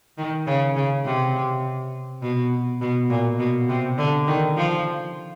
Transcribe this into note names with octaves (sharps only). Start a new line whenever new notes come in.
D#3
C#3
C#3
C3
B2
B2
A#2
B2
C3
D3
D#3
F3